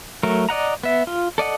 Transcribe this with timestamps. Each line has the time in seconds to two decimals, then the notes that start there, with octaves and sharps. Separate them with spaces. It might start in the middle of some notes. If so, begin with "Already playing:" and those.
0.23 F#3 A3 A#4
0.49 D5 D#5 F#5 A#5
0.83 B3 E5
1.07 F4
1.38 A4 D5 D#5 F#5